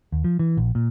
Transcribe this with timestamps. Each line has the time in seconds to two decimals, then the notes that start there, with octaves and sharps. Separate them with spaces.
0.12 D#2
0.24 F3
0.39 E3
0.57 A#1
0.75 A#2